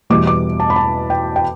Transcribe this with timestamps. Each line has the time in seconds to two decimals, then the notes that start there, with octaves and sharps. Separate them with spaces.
0.10 E2 B2 G3 D6
0.27 D6
0.60 A5
0.70 B5
0.76 A5
1.10 G5
1.36 G5